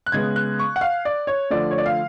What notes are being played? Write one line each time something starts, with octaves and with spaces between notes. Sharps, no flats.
F#6
C#3 G#3 B3 G#6
F#6
C#6
F#5
F5
D5
C#5
D3 F3 A3 D5
C#5
D5
F5